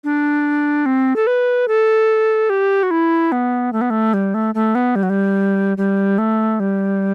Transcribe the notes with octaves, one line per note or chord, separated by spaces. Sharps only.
D4
C4
A4
B4
A4
G4
F#4
E4
B3
A3
B3
A3
G3
A3
A3
B3
G3
F#3
G3
G3
A3
G3